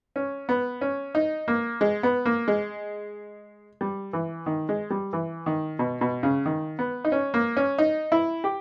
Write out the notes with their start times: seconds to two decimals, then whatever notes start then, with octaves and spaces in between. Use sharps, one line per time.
0.16 C#4
0.49 B3
0.81 C#4
1.15 D#4
1.48 A#3
1.81 G#3
2.03 B3
2.25 A#3
2.48 G#3
3.81 G3
4.13 E3
4.46 D#3
4.69 G#3
4.90 G3
5.13 E3
5.46 D#3
5.79 B2
6.01 B2
6.23 C#3
6.46 D#3
6.79 B3
7.04 D#4
7.12 C#4
7.34 A#3
7.57 C#4
7.78 D#4
8.12 E4
8.44 G4